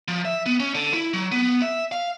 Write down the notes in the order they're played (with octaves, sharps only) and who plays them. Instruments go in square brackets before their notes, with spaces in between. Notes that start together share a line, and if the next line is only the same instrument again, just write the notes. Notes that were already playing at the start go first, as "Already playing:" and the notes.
[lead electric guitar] F3
E5
B3
C#4
D3
E4
F#3
B3
E5
F5